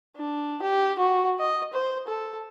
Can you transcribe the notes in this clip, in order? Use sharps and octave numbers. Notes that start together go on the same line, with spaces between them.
D4
G4
F#4
D#5
C5
A4